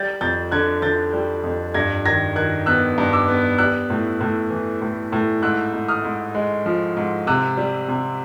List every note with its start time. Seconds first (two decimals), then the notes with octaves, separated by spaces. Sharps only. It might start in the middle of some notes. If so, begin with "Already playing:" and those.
Already playing: G3 G6 A6
0.21 F2 G6 A6
0.51 D3 F#6 G#6
0.82 D3 G6 A6
1.13 G3
1.44 F2
1.74 G2 G#6 A#6
2.05 D#3 G#6 A#6
2.36 D#3 F#6 G#6
2.66 B3 E6 F#6
2.98 G2
3.13 D6 E6
3.28 B3
3.58 G3 E6 F#6
3.90 A2
4.21 A2
4.50 E3
4.82 A2
5.12 A2
5.42 G#2 E6 F#6
5.73 G#2
5.88 D#6 F6
6.04 G#2
6.35 G#3
6.66 F3
6.96 G#2
7.27 C3 E6 F#6
7.57 G3
7.88 C3